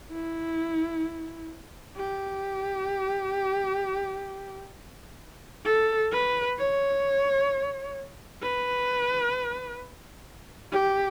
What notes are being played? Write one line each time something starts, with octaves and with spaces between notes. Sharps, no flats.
E4
G4
A4
B4
C#5
B4
G4